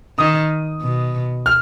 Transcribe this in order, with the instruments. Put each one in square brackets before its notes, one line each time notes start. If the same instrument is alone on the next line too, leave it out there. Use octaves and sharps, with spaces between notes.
[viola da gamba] D#3 [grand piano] D#6
[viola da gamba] B2
[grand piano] F6